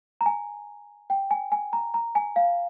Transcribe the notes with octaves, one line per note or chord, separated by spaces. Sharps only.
A#5
G#5
G5
G#5
G#5
A#5
A#5
G#5
F5